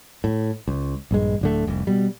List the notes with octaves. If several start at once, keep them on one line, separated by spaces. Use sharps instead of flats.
A2
C#2
A#1 G2 G#3
D1 D3 A3
F1 C2
B2 G3